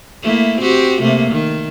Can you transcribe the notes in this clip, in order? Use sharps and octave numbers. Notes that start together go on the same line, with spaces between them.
A3 A#3 E4
C4 F#4 G4
C3 A3 A#3
D#3